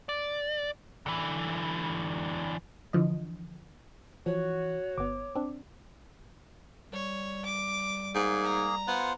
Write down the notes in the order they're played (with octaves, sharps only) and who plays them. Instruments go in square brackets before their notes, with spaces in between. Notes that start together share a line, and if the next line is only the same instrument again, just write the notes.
[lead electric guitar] D5
D3 E3
[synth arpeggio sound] D3 E3 F3 D#5
[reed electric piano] E3 [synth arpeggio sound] F3 [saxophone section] F#4 [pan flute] C#5
[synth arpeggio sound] G1 B3 [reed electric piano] D6
[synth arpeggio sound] C4 D4
[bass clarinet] G3 [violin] C#5
[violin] D6
[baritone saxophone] G#2 [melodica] A#3 G#4
[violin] A#5
[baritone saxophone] B3 [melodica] F4 C5 F#5